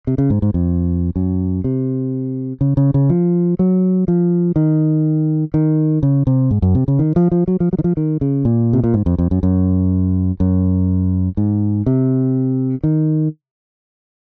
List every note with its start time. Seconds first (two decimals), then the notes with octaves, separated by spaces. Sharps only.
0.07 C3
0.18 C#3
0.30 G#2
0.42 G#2
0.54 F2
1.16 F#2
1.64 C3
2.61 C#3
2.77 C#3
2.94 C#3
3.10 F3
3.59 F#3
4.08 F3
4.56 D#3
5.54 D#3
6.03 C#3
6.27 C3
6.51 G#2
6.62 F#2
6.75 C3
6.88 C#3
6.99 D#3
7.16 F3
7.32 F3
7.48 F#3
7.60 F3
7.73 F#3
7.79 D#3
7.84 F3
7.97 D#3
8.21 C#3
8.45 A#2
8.73 C3
8.84 A#2
8.94 G#2
9.06 F2
9.18 F2
9.31 F#2
9.43 F#2
10.40 F#2
11.37 G#2
11.86 C3
12.84 D#3